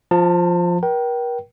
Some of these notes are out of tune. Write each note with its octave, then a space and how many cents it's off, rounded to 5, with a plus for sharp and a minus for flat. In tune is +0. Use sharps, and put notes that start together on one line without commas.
F3 +0 A5 +35
A#4 +40 G5 -20